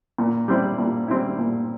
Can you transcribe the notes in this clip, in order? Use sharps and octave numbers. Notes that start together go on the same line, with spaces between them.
A#2
G3 C4 E4
A#2
G3 C4 E4
A#2